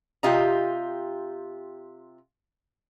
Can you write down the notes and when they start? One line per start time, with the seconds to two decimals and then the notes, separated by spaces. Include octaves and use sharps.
0.23 C3 F4 G4 D#5 A#5